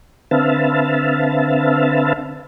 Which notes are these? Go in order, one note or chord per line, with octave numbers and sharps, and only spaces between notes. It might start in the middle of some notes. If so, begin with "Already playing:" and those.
D3 C4 B4 E5 F5 A5